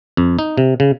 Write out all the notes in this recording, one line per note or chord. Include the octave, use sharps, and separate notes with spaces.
F2
D#4
C3
C#3